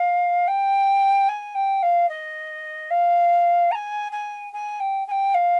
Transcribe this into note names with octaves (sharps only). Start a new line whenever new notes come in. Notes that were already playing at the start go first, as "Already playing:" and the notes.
Already playing: F5
G5
G#5
G5
F5
D#5
F5
A#5
G#5
G#5
G#5
G5
G#5
G5
F5